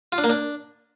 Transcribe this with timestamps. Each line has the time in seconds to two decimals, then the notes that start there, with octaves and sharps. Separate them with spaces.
0.12 F4
0.18 D4
0.24 A#3
0.30 D4